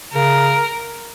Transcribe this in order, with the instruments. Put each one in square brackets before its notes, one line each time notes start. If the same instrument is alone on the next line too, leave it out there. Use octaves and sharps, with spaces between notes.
[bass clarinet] C#3 [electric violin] A#4